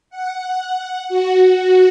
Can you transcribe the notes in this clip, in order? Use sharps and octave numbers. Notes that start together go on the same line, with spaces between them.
F#5
F#4